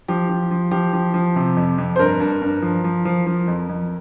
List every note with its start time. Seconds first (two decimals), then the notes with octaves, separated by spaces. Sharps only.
0.08 F3 G4
0.29 F3
0.51 F3
0.71 F3 G4
0.93 F3
1.14 F3
1.36 C3
1.57 F2
1.78 F2
1.96 C5
1.99 G2 A#4
2.20 G2
2.42 G2
2.62 F3
2.84 F3
3.05 F3
3.27 F3
3.48 F2
3.69 F2